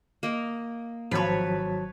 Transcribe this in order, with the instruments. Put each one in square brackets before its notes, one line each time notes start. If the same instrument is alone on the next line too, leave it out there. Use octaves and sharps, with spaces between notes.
[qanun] A#3 D#5
[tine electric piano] G#1 F#3 A5 [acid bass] F3 [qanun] B4 C#5